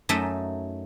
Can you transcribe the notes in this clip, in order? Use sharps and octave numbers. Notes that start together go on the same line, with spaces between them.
F#2 F#3 A3 D#4 E5